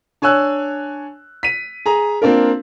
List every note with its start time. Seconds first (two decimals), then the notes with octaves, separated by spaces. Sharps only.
0.22 D4 C#5 G#5 E6 F#6
1.43 B6 D#7
1.86 G#4 A#5
2.22 A#3 C4 D4 F4 A#4